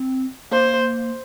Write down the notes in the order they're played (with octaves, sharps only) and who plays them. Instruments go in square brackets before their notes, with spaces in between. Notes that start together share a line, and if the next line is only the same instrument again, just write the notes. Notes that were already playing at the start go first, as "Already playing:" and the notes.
Already playing: [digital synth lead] C4
[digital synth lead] A#3 [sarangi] C5